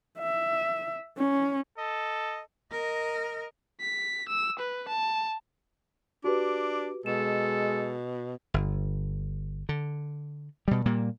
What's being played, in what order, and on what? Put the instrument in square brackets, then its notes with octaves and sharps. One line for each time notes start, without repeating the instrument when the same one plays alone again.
[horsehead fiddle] E5
C#4
[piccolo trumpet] A4 [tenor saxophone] D#5
[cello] A#4 D#5
[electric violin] B6
E6
B4
A5
[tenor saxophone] D4 [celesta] F#4 G4 B4 [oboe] D6
[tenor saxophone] B2 [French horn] G#3 [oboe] A4 [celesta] E7
[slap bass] G1
D3
B2 G3
A#2 G3 A#3